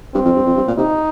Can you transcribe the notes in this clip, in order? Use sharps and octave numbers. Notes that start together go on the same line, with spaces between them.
G2 C4
F2
G2
F2
G2
A#2
C3 D#4